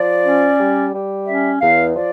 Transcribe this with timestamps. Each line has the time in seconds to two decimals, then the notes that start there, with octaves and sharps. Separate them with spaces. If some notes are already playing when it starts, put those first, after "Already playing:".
Already playing: F3 D5
0.24 C#4
0.59 G3
0.93 G3
1.27 C#4 E5
1.61 E2 F5
1.96 F3 D5